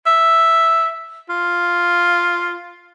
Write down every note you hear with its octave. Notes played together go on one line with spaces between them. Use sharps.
E5
F4